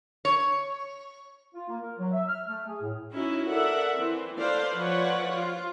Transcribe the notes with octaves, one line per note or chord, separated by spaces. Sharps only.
C#5
F4
A#3
A#4
F#3
E5
F6
A3
G#4
A2
C#4 D#4 E4 F#4
A4 A#4 D5 E5 F#5
E3 C4
A4 B4 C5 D5 F5
F3 B4 C#5 D5 F#5
F4